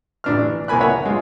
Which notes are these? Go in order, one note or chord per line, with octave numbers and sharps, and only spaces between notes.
A1 D4 F6
E3
C2 A#3 A#4 G#5 B5 F#6
C#5 E5 F#5 B5
G#3 F4